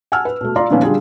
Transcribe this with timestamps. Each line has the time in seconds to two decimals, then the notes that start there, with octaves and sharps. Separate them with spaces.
0.12 F#5 G#5 A5 E6 F6
0.25 B4
0.41 B2 A3
0.56 F4 D5 A#5 C6
0.70 A#2 D#3 F3 A#3 B3 C#4
0.83 D3 G3 F4 G#4